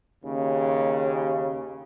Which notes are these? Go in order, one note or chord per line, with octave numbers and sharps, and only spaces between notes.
D#2 C#3